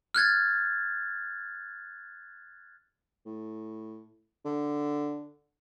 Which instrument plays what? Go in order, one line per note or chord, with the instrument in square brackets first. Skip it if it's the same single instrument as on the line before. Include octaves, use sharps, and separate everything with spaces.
[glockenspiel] F6 F#6 G#6 A6
[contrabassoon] A2
D3